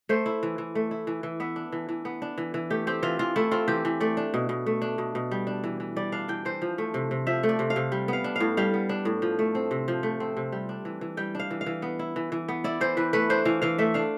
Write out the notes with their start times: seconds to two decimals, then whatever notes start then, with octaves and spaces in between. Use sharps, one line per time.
0.09 A3 C5
0.26 E4
0.43 E3
0.58 E3
0.75 A3
0.91 E4
1.07 E3
1.23 E3
1.40 B3 E5
1.56 D4
1.72 E3
1.89 E3
2.05 B3
2.22 D4
2.38 E3
2.54 E3
2.70 A3 G4
2.87 C4 G4
3.03 E3 F4
3.19 E3 F4
3.36 A3 E4
3.51 C4 F4
3.68 E3 G4
3.85 E3
4.00 A3 D5
4.17 D4
4.34 B2
4.49 B2
4.66 A3
4.82 D4
4.98 B2
5.15 B2
5.31 G3
5.47 D4
5.64 E3
5.80 E3
5.96 G3 D5
6.12 D4 F5
6.28 E3 G5
6.45 E3 C5
6.62 F3
6.78 A3
6.94 C3
7.11 C3
7.27 F3 E5
7.43 A3
7.49 D5
7.59 C3
7.70 F5
7.76 C3
7.92 G3
8.08 B3 F5
8.24 D4
8.36 A2 F5
8.57 G3 F5
8.74 B3
8.89 D4
9.05 A2
9.22 F3
9.39 A3
9.55 C4
9.71 C3
9.88 F3
10.03 A3
10.20 C4
10.37 C3
10.52 G3
10.69 D4
10.85 E3
11.01 E3
11.17 G3 G5
11.35 D4 F5
11.51 E3
11.61 F5
11.66 E3
11.82 B3
11.99 E4
12.16 E3
12.32 E3
12.48 B3
12.64 E4 D5
12.81 E3 C5
12.97 E3 B4
13.13 A3 B4
13.30 D4 C5
13.45 E3 F5
13.62 E3 F5
13.78 A3 E5
13.94 D4 F5